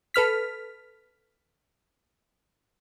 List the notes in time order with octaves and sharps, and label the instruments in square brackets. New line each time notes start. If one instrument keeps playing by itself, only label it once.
[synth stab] A4 B4 F6 B6